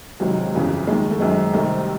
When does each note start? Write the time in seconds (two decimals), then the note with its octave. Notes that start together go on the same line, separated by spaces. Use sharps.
0.20 C#2 C3 D#3 F#3
0.53 G1 F2 C#3 E3
0.87 D#2 D#3 G#3
1.11 A3
1.20 G#1 F#2 D#3 G#3
1.53 C2 C3 D#3 A3